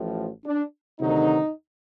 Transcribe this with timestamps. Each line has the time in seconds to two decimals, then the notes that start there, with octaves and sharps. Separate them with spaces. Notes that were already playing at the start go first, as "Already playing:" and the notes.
Already playing: A1 A2 F3
0.45 D4
1.00 D2 C3 D#3 F#3 D#4